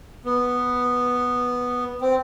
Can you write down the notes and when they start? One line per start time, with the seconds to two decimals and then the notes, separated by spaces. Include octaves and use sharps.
0.25 B3
2.01 C4